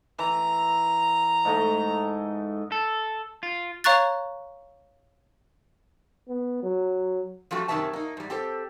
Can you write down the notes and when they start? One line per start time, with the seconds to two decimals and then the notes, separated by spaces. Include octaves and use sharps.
0.19 E3 A#5
1.45 G#2 A3 D#5
2.72 A4
3.43 F4
3.84 C#5 F5 A#5 C#6 F#6 A6
6.28 B3
6.63 F#3
7.51 F3 G3 A3 C#4 F4 F#4
7.68 F#2 C3 D#3 A#3 E5 A5
7.93 A#3 D#4
8.17 G#2 G3
8.30 C4 G4 A4 C5